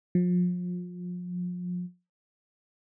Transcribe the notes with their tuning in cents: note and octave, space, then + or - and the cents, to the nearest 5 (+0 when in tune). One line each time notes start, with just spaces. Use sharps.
F3 +35